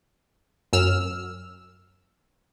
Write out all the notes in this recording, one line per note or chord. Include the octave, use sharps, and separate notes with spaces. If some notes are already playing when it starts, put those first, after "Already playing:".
F#2 E6 F6